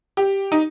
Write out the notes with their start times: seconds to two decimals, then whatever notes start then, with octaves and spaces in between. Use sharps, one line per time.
0.17 G4
0.52 D#4